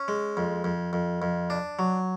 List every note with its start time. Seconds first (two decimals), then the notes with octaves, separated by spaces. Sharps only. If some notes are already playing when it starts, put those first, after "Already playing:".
Already playing: C#4
0.08 G#3
0.37 F2
0.64 F2
0.93 F2
1.22 F2
1.50 D4
1.79 F#3